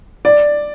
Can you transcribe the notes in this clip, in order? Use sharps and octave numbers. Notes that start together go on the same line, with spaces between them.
D5